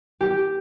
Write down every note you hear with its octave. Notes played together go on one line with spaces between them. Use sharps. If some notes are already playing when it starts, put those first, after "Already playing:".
G4